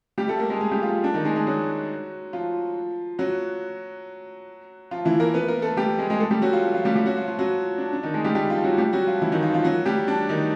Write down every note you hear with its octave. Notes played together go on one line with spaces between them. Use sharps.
G3 G4
A3 A4
A#3 A#4
G#3 G#4
G#3 G#4
G3 G4
F3 F4
D4
D#3 D#4
G#3 G#4
G#3 G#4
F#3 F#4
F3 F4
F#3 F#4
F3 F4
E3 E4
A#3 A#4
B3 B4
A#3 A#4
A3 A4
G3 G4
G#3 G#4
G#3 G#4
A3 A4
G3 G4
F#3 F#4
F3 F4
F3 F4
G3 G4
G3 G4
F#3 F#4
F3 F4
F3 F4
F#3 F#4
D4
D4
D#3 D#4
G#3 G#4
G3 G4
G3 G4
F3 F4
F#3 F#4
G3 G4
F#3 F#4
F3 F4
E3 E4
D#3 D#4
F3 F4
F3 F4
F#3 F#4
G3 G4
D4
D#3 D#4